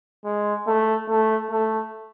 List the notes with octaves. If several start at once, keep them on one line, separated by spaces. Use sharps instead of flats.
G#3
A3
A3
A3